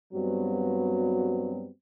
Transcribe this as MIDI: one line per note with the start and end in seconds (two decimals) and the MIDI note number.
0.13 1.68 43
0.13 1.68 54
0.13 1.68 55
0.13 1.68 59
0.13 1.68 60
0.13 1.68 66